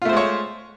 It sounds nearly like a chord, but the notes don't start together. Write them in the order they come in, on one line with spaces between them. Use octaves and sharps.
F4 A3 C5 G#3 C#5